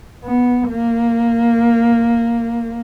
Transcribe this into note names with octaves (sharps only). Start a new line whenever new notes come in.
B3
A#3